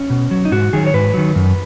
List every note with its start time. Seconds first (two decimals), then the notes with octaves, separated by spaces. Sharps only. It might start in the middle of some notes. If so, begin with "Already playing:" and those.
Already playing: C#4
0.10 B2
0.31 F#3
0.45 D#4
0.51 G#2 F#4
0.73 D#3 F#3 G#4
0.86 C#5
0.94 G#2 B4
1.14 D#3 F#3
1.35 F#2